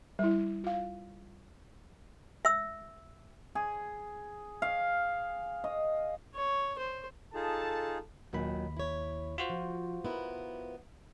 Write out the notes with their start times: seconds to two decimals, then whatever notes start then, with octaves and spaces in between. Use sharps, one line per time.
0.19 G3 E4
0.64 F4 F5
2.45 E5 E6
3.55 G#4
4.62 F5
5.64 D#5
6.35 C#5
6.78 C5
7.34 D#4 F4 G#4 A4 A5
8.33 D#2 A#2 D#3 F#3 B5
8.77 E4 C#5
9.38 F4 F#4 C5
9.50 F3
10.05 B3 E4 A#4